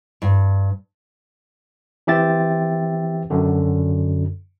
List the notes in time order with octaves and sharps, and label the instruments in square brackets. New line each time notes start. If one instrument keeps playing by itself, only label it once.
[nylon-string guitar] G2
[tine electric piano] E3 C4 G4 E5 G5 A6
F#2 D3